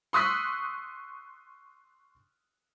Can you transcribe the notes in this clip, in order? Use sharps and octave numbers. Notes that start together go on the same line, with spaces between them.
C6 C#6 D#6 E6 F#6 B6